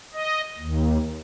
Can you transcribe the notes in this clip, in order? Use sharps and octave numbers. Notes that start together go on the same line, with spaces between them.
D#5
D#2